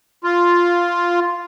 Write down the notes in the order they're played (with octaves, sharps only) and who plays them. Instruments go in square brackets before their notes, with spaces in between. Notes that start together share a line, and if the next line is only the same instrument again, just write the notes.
[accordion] F4